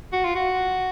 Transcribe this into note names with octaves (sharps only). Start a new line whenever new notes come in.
F#4
F4
F#4